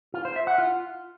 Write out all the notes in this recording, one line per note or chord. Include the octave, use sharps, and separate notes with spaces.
F4
C5
E5
F#5
F4